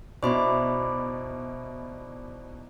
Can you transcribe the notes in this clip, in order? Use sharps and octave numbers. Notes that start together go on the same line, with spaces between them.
B2 D#4 E4 C5 D5 B5 C6